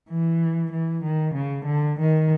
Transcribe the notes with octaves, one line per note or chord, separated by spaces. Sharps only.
E3
E3
D#3
C#3
D3
D#3